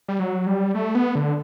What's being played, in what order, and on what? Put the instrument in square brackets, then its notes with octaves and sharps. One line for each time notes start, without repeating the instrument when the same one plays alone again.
[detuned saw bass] G3
F#3
G3
A3
B3
D3